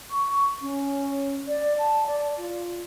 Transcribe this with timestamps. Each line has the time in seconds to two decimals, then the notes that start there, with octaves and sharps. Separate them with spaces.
0.11 C#6
0.62 C#4
1.47 D5
1.79 A5
2.06 D5
2.38 F4